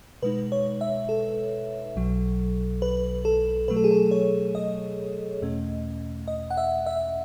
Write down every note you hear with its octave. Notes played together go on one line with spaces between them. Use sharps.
B2 G#3 D#4 B4
C#5
E5
A4
B1 B2 F#3
B4
A4
B2 F#3 A3 B4
A4
G#4
A4
C#5
D#5
E2 B2 A3 C#4
D#5
F#5
E5
E5